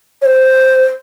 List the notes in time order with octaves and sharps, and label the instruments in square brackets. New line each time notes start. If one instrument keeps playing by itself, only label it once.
[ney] C#5
C5